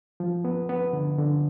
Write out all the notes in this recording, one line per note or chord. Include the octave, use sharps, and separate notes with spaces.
F3
B3
B3
D3
D3